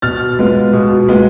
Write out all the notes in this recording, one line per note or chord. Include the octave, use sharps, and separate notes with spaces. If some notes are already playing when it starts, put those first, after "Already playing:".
B2 F6 A6
G#3 B3 F4
B2
G#3 B3 F4